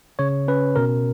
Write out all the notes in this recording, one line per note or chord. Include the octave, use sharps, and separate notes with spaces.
C#3 C#5
C#4 B4
B2 A#4